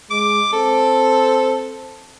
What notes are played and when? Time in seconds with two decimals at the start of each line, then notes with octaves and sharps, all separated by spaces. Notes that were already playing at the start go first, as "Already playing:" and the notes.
0.11 G#3 D6
0.53 C4 A4